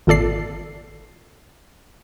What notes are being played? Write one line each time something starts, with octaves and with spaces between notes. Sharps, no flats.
G#1 A#2 A4 D5 C7